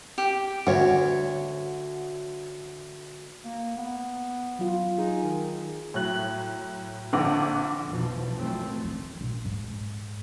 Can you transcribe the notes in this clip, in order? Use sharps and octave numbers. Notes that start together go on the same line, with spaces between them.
G4
D2 C#5 F#5
A#3
B3
F#3 F4
D#4 G#4
D#3
A2 F#3 F#6
A#1 D3 F#5 D6
F1 B1 E2 B2 F3
A1 F#2 F3 F#3 A3 C4
D#3
A#1
G#2